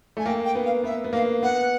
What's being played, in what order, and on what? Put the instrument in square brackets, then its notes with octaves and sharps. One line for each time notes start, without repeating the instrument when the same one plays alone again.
[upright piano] A3 [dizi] G#5
[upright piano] A#3 [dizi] G5
[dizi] G5
[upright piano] B3
[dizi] F5
[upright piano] B3 [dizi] E5
[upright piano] B3
[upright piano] A#3 [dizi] F5
[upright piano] B3 [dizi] F#5